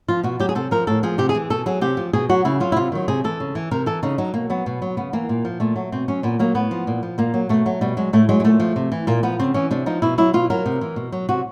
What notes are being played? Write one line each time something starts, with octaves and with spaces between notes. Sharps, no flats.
F3 F4
B2 F#4
F#3 G4
G#4
C3 A4
F3 A#4
A2 A4
F3 G#4
C3 G4
G#4
E3
B2 A4
F#3 G#4
C3 G4
F3
B2 G#4
F#3 F#4
C#3 E4
F#3 F4
E4
C3 F4
D#3 F#3
C3 G#4
E3 A4
C#3
E3
C3 A#4
E3 A4
C#3 D#4
F#3 D#4
B2 A#3
F#3 B3
B2
F#3
C#3 B3
E3 A#3
A#2
F3
A#2 A3
F#3
B2 C4
F#3 C#4
A#2 B3
F#3 A#3
A2 B3
F3
A#2
F3
A#2 A#3
F#3
B2 A3
F#3
B2 G3
F#3 G#3
A2 A3
F#3 G#3
G#3
A#2 A3
F3
C3
E3
A#2 A#3
F3 B3
C#3 C4
E3 C#4
C3 D4
F3 D#4
B2 E4
F#3 E4
B2 F4
F#3 A#4
C3
E3
B2
F#3
C3 F#4